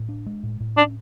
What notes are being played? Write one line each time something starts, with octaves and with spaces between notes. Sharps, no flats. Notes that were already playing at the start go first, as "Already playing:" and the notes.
Already playing: A2
D4
G#3
A2
A2
C#4 D4